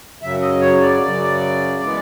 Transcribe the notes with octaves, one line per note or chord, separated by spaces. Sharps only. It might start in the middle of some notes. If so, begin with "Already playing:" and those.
F#2 C#3 F#3 E5
D#5
C#5
D5
F#2 C#3 F#3
E3 G#3 B3